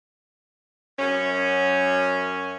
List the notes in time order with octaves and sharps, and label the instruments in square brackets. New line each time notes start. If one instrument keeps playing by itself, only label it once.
[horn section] F#2 C#4